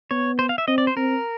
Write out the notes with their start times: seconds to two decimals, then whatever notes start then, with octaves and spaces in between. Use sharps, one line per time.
0.11 B3 C#5
0.39 C5
0.49 F5
0.58 E5
0.68 C4 D#5
0.78 D5
0.87 C5
0.97 C4 A#4